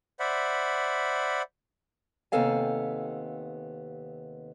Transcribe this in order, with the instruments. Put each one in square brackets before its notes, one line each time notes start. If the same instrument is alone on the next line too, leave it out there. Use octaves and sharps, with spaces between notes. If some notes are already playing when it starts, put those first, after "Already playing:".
[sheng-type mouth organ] C5 D5 E5 F#5 B5
[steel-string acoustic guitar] D#2 C3 B3 A4 F5 G#5